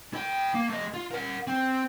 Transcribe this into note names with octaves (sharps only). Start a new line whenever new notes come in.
E4 G5
A#3
A3 D#5
F4
A#4 F#5
C4